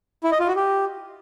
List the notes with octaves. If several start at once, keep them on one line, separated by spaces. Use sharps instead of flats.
E4
D#5
F4
F#4
G4